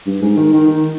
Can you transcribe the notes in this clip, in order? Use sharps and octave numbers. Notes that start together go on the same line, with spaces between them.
G2
G#2
D#3
D#3
D#3